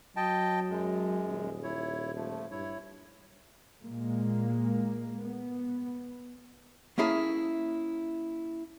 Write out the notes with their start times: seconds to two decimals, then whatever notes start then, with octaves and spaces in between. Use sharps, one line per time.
0.16 F#3 D#5 G5 A5
0.70 F#2 G#3
1.27 D#1
1.63 E4 C#5
2.16 F3 A3
2.51 G2 E4 C#5
3.82 A#2 G#3 A#3
5.27 B3
6.98 A#3 C#4 E4 G#4 A4